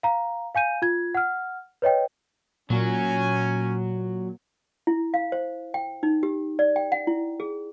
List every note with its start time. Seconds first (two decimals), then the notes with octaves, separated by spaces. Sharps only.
0.03 F5 A#5
0.55 F5 G#5 G6 D#7
0.82 F4 G#6
1.15 F#5 F6
1.82 B4 C#5 D#5 G5
2.70 A#2 F#3 C#4 G#5
4.87 E4
5.14 F5
5.32 C5
5.74 G5
6.03 D#4
6.23 G4
6.59 D5
6.76 G5
6.92 F#5
7.07 E4
7.40 G#4